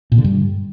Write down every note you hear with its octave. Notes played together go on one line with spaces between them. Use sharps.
A#2
D3
G2